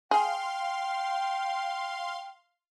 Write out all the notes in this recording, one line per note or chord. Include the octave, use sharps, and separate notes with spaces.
G#4 F5 G5 C6